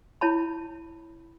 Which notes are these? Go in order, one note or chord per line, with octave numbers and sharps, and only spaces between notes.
E4 C#5 A5 B5